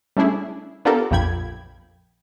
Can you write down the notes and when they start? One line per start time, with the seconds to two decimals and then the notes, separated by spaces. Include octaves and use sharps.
0.17 G3 A3 C#4 D4 E4 G#4
0.85 B3 D4 F4 G4 A4 A#4
1.11 A#1 F2 F3 G5 B5 G#6